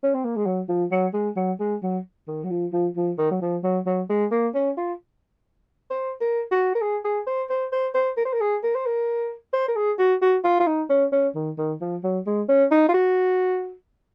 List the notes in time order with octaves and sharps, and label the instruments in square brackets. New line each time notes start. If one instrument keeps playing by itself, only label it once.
[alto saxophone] C#4
C4
A#3
G#3
F#3
F3
F#3
G#3
F#3
G#3
F#3
D#3
F#3
F3
F3
F3
D#3
F#3
F3
F#3
F#3
G#3
A#3
C#4
F4
C5
A#4
F#4
A#4
G#4
G#4
C5
C5
C5
C5
A#4
C5
A#4
G#4
A#4
C5
A#4
C5
A#4
G#4
F#4
F#4
F4
F4
D#4
C#4
C#4
D#3
D#3
F3
F#3
G#3
C#4
D#4
F4
F#4